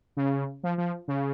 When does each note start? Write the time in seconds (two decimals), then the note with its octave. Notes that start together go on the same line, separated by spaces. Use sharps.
0.17 C#3
0.63 F3
0.78 F3
1.08 C#3